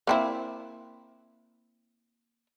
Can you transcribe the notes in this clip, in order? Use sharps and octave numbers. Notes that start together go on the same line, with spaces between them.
A#3 C4 E4